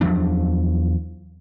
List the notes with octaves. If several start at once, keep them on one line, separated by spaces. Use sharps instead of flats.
E2 F3 F#3 D4